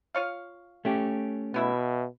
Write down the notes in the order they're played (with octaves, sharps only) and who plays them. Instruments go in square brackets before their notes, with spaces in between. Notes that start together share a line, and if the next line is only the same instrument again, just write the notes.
[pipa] F4 C#5 F5
[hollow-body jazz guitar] A3 C#4 G4
[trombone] B2 [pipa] B3 E4 E5